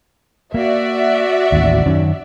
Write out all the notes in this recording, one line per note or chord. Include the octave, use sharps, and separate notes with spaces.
A#3 F#4 D5 E5
A1 D#2
F#2 D#3 C#4